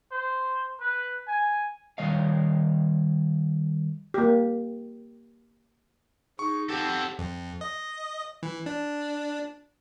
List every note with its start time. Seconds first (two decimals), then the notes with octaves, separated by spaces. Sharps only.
0.12 C5
0.80 B4
1.27 G#5
1.98 D#3 G3 C#5 D#5 F5
4.14 A#3 G4
6.39 D#4 G#4 C#6
6.70 C4 G4 A4 F#5
7.19 F2
7.61 D#5
8.43 E3
8.66 D4